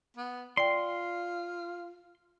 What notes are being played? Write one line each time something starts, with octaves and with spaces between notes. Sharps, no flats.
B3
F4 D5 G5 C6